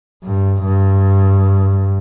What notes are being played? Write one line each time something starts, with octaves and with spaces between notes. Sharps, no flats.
G2
G2